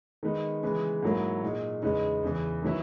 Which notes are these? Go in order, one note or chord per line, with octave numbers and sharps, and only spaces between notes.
D#3 G#3 B3 D#4
C#3 E3 G#3 B3
G#2 F#3 A#3 E4
A#2 G#3 D#4
E2 C#3 G#3 B3 D#4
E2 C#3 E3
D#3 F#3 B3 E4